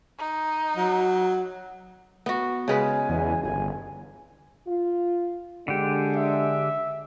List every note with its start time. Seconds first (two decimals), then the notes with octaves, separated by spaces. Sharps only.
0.19 D#4
0.76 F#3
2.26 B3 F#4
2.68 C#3 G#3 B4 G#5
3.09 E2
3.43 G1 G#5
4.68 F4
5.68 D3 G#3 D4 G4
6.16 E5